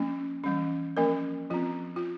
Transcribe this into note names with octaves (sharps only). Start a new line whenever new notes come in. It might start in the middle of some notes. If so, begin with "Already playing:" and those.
Already playing: F3 A#3 C#4
E3 G3 C#4
F3 A#3 C#4 A#4
F3 C4 F4
F4